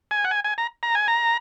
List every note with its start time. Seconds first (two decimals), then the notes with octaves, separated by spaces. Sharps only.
0.11 G#5
0.24 F#5
0.31 G#5
0.44 G#5
0.58 A#5
0.83 A#5
0.95 G#5
1.08 A#5